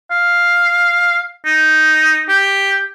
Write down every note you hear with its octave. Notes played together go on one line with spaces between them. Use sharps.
F5
D#4
G4